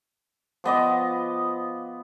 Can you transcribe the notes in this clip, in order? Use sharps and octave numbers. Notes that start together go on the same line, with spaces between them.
F3 B3 D#5 D6